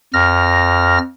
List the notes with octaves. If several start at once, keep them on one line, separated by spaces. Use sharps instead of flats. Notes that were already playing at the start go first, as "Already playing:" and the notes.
F2 F6 A#6